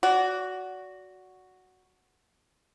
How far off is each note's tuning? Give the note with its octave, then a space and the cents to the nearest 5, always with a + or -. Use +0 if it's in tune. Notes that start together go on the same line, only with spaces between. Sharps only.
F#4 +0 D5 -30